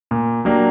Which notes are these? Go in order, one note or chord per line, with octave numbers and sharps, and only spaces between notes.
A#2
F#3 A#3 D4 G4